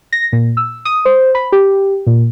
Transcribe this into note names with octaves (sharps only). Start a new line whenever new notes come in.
A#6
A#2
E6
D#6
C5
B5
G4
A#2